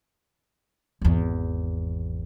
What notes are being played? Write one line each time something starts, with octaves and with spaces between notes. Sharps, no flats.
G#1 E2